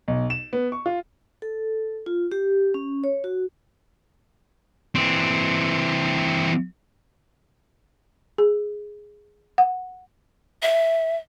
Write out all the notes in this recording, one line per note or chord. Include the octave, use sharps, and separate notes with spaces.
B1
E7
B3
C#6
F4
A4
F4
G4
C#4
C#5
F#4
E3 C4
G#4
F#5
E5